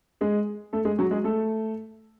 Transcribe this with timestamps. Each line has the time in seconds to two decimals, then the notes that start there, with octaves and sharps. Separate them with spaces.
0.21 G#3 G#4
0.73 A3 A4
0.85 G#3 G#4
0.98 F#3 F#4
1.11 G#3 G#4
1.24 A3 A4